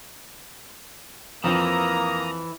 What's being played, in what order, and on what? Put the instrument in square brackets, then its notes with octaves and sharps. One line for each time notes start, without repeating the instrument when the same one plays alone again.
[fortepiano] F2 F3 C5 [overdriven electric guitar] E3 [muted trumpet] A#3 [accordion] A#5 D#6